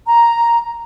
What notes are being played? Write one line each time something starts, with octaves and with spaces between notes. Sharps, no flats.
A#5